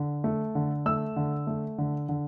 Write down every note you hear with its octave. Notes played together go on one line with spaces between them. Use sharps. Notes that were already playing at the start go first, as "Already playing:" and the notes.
Already playing: D3
A3
D3
A3 E6
D3
A3
D3
D3